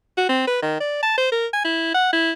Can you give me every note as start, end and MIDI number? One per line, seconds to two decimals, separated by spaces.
0.17 0.25 66
0.29 0.42 60
0.47 0.61 71
0.62 0.76 51
0.80 0.99 74
1.02 1.17 81
1.18 1.32 72
1.32 1.47 70
1.53 1.61 80
1.64 1.91 64
1.94 2.12 78
2.12 2.31 64